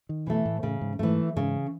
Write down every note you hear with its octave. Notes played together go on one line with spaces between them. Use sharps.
D#3
B2 E3 A3
A2
A2 C#3
G#2
G#2 E3 A3
G#2 C#3